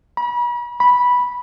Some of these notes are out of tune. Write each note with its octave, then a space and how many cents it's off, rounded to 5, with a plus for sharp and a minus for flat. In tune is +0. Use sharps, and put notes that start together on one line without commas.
B5 -40
B5 -10